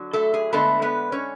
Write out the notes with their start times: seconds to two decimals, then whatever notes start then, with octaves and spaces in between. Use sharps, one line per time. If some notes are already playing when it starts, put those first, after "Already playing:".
Already playing: D3 F#3
0.13 A3 A4
0.34 G#4
0.53 D3 G#3 A3 B3 A4
0.82 B3 B4
1.12 C#4 C#5